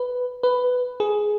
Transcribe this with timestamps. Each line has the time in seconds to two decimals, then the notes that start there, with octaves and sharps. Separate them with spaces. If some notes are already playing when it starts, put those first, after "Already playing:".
Already playing: B4
0.43 B4
1.00 G#4